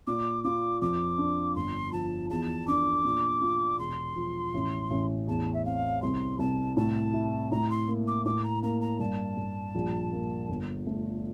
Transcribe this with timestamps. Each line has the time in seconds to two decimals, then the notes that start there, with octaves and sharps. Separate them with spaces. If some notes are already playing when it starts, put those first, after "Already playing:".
0.07 A#2 D6
0.44 F4 D6
0.81 F2 D6
1.18 D4
1.55 G1 C6
1.92 F3 A5
2.30 E2 A5
2.67 D4 D6
3.04 A#2
3.41 F4
3.78 E1 C6
4.16 F3
4.54 A1
4.91 A1
5.27 E2 A5
5.53 E5
5.65 C4 F5
6.02 C2 C6
6.39 C2 A5
6.76 A2 A5
7.13 E4
7.51 A2 A#5
7.70 C6
7.88 A#3
8.07 D6
8.25 A2 D6
8.44 A#5
8.63 A#3 A#5
8.81 A#5
8.99 G2 A5
9.37 G2
9.75 A#1
10.12 A#3
10.49 G1
10.87 A3